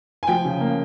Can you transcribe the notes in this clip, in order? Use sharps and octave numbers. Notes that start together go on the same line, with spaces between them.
G#5
F3 G5
C#3
A#3